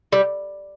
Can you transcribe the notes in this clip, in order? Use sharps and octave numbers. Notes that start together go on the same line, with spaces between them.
G3